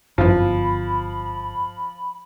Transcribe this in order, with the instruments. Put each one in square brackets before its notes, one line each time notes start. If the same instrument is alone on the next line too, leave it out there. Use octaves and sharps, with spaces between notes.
[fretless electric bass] G1 [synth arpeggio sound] F#2 E3 [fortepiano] F3 [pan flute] B5